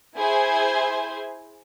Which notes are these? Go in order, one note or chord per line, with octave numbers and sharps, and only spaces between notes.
E4 G#4 C5 G#5